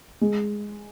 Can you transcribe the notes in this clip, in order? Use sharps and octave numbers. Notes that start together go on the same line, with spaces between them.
G#3